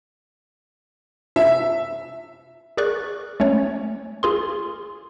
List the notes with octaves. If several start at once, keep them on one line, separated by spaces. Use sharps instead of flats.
E5
G#4 A#4 D5 C#6 F#6
A3 C#4 C#5
F4 G#4 C6